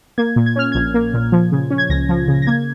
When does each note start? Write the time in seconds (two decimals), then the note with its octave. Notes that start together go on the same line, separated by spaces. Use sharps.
0.18 A#3 G#6
0.36 A#2
0.46 G#6
0.56 C#4 F6
0.72 A#1 G#6
0.94 A#3
1.14 A#2
1.32 F3
1.52 C#3
1.71 C#4
1.78 G#6
1.89 C#2 A#6
2.09 F3
2.28 C#3
2.42 A#6
2.47 A#3 G#6